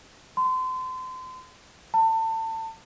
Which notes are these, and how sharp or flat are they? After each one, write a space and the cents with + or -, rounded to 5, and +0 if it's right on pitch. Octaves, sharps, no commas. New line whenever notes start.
C6 -35
A5 +30